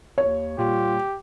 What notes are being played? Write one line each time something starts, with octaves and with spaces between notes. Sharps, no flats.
D#2 C#5
A#2 G3 F4 G4